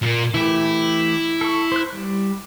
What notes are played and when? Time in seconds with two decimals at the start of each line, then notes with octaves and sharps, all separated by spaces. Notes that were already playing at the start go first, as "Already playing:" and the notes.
0.02 A#2 A#3
0.34 E3 A3 E4 G4
1.41 A4 C#6
1.72 C5 F#6
1.93 G3